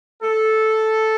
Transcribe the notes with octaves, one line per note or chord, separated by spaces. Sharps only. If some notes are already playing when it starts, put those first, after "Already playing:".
A4